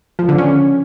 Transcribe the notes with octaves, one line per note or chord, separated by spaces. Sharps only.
F3
D3
C#4